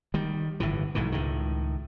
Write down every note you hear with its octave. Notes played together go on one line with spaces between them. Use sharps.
D#3 G3
G1 A2 E3
B1 G#2 D#3 E3
C#2 A2 D#3